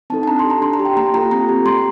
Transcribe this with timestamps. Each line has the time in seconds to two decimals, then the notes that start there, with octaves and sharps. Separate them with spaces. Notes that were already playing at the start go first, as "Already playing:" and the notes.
0.10 C4 D#4 A4 A5
0.23 A5
0.28 D4 A#5
0.39 C6
0.45 G4
0.50 A#5
0.62 D4 C6
0.73 A#5
0.79 G4
0.85 G5
0.97 A#3 A#5
1.14 F4 A4 A#5
1.31 C4 A#5
1.49 G4
1.65 A3 C6